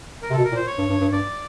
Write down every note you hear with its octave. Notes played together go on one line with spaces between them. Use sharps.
A#4
C3
B2 A4
A#4
A#2
C5
C#5
G2
G2
G2
G2 D5